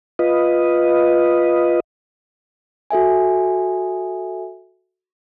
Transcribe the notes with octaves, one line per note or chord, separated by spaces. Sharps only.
F4 B4 D#5
F#4 A4 E5 G#5